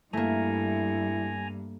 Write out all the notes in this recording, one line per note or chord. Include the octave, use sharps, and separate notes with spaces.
G2 A3 A#3 E4 G#5 A#5